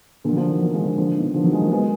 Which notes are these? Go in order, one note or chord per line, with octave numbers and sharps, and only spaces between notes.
A#2 D3
F#3
D3 F3
D#3 F#3
F#3 A#3
F3 G#3
D3 F3
D3 F3
B2 D#3
D3 F3
D#3 F#3
F3 G#3
F#3 A#3
G#3 B3